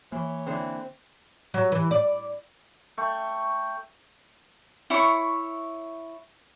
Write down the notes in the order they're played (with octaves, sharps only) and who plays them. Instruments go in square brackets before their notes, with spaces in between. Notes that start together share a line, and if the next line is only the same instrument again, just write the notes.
[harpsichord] E3 [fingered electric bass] A#3 [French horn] C#5
[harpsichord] D3 E3 [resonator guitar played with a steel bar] C4
[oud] F#3
E3
D5
[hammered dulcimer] A3 G5 C#6
[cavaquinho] E4 C#5 C#6